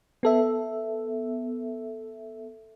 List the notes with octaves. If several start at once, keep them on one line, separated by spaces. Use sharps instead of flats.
B3 A4 E5